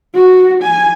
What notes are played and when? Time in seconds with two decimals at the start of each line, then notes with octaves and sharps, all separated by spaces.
0.15 F#4
0.63 G#5